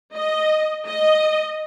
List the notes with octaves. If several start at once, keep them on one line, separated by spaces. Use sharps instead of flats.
D#5
D#5